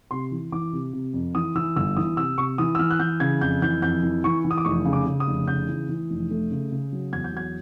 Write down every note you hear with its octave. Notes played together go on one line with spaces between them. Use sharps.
C3 C6
E3
E3 D6
C3
C3
F2
E3 D#6
E3 E6
G1 E6
E3 D#6
C3 E6
C3 C#6
E3 D#6
E6
E3 F6
F#6
E3 G6
C#3 G#6
F2 G6
E3 G6
F2 G6
E3
E3 C#6
E3
D#6
D6
F1 C#6
C#3
D6
C#3
D#6
F1
C#3 G6
E3
E3
F1
A3
C#3
C#3
F#3
E2 G#6
G6
F#3 G#6